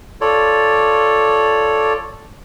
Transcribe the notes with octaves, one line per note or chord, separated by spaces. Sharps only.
F4 A4 C#5 D5